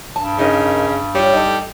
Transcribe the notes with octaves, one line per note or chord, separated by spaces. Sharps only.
G2 A5
C#3 D#4 A#4 D#5
G3 F4 C#5
D#4 A4